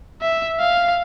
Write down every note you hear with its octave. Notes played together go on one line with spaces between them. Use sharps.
E5
F5